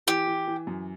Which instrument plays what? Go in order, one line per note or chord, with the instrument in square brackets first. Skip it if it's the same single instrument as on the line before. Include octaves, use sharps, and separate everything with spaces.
[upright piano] E3 [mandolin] G4
[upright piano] E3
E3
F#2